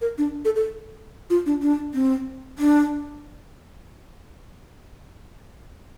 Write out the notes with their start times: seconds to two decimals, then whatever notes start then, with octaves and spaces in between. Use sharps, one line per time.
0.01 A#4
0.18 D4
0.45 A4
0.56 A4
1.30 F4
1.46 D4
1.62 D4
1.94 C4
2.58 D4